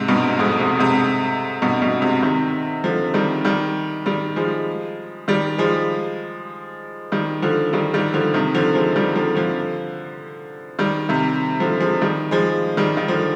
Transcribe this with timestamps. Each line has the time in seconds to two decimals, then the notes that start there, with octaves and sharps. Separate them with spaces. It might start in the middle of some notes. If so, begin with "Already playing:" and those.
Already playing: G#2 C3
0.08 G2 B2
0.39 F2 G#2
0.60 G#2 C3
0.79 G#2 C3
1.62 G2 B2
1.82 G2 B2
2.02 G#2 C3
2.22 C3 D#3
2.84 D3 F3
3.14 D#3 G3
3.45 D#3 G3
4.06 D#3 G3
4.36 F3 G#3
5.28 D#3 G3
5.58 F3 G#3
7.12 D#3 G3
7.42 D3 F3
7.73 D#3 G3
7.94 D#3 G3
8.14 D3 F3
8.34 C3 D#3
8.54 D3 F3
8.75 F3 G#3
8.96 D#3 G3
9.16 D3 F3
9.36 D3 F3
10.79 D#3 G3
11.09 C3 D#3
11.60 D3 F3
11.80 F3 G#3
12.01 D#3 G3
12.31 F3 G#3
12.77 D#3 G3
12.97 D#3
13.08 D3 F3